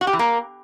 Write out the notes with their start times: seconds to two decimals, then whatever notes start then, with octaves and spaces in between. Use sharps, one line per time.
0.01 F#4
0.07 G4
0.13 E3
0.19 A#3